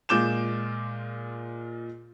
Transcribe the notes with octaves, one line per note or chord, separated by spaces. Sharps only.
A#2 G#3 F4 D6 G6 E7